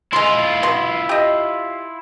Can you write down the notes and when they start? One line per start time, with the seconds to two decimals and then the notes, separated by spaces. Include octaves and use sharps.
0.13 G#3 E4 F4 C6
0.63 F#3 B3 C6
1.09 G4 D#5